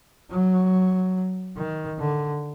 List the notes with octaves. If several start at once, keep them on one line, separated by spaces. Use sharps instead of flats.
F#3
D#3
D3